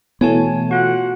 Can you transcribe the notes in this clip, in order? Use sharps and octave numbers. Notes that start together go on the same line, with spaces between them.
B2 E3 A3 B3 C#5 G#5 A5
F4 F#4 F#5